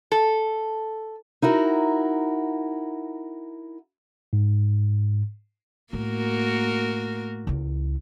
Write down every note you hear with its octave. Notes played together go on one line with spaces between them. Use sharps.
A4
D#4 E4 F#4 A#4
G#2
A2 A#3 F#4 A#4
C#2 E4